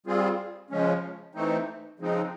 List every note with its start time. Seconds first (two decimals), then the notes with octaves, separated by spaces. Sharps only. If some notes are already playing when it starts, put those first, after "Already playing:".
0.06 G3 C4 F4 G#4
0.70 C#3 F3 G#3 C#4
1.35 E3 A3 C4 D#4
1.99 C#3 F3 G#3 C4 D#4